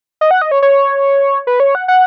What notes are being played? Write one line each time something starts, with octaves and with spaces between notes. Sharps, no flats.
D#5
F#5
D#5
C#5
C#5
B4
C#5
F#5
F#5